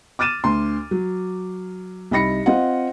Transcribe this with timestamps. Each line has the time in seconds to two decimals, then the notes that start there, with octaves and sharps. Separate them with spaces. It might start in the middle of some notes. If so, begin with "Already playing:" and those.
0.19 D6 F6 A6 D#7 E7
0.44 D2 C6
0.91 F#3
2.11 C2 D#4 B5 A#6 C#7
2.46 C4 F4 D#5 F#5